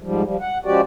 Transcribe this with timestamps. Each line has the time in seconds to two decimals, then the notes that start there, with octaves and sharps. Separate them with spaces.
0.02 G#2 F3 G3
0.24 F3 G3
0.41 F#5
0.65 C#3 F3 G#3 F#4 G4 D5